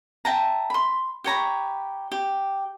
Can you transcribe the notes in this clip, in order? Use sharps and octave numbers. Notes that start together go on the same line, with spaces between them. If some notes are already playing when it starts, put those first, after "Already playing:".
E5 G5 A5 A#5
B5 C6
G4 C#5 A#5 B5
G4